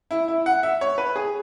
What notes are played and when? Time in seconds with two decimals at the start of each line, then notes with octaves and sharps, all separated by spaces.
0.11 E4
0.28 E4
0.46 F#5
0.63 E5
0.81 C#5
0.98 B4
1.16 G#4